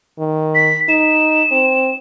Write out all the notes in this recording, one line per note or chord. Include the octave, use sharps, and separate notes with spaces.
D#3
B6
D#4 E7
C4